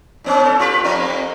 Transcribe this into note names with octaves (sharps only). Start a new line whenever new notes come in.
A#2 B3 C#4
A4
F4 G4 B4
F2 A#3 C4